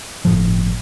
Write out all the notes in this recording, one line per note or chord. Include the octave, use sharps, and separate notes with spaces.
G1 A2 F3